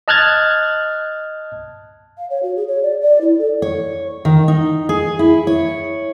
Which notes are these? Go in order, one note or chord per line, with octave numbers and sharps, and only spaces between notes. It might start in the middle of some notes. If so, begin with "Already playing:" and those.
D#5 A5 F6 F#6 G#6 A6
F5
C#5
F#4
G#4
C#5
D5
D5
E4
A4
C#5
D#3
D#4
G#4
E4
C#5